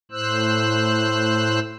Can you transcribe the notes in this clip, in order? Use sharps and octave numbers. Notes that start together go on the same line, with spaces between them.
A2 C5 E6 F#6